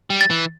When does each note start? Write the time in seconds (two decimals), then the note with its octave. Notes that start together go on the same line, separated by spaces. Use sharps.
0.10 G3
0.21 A6
0.30 E3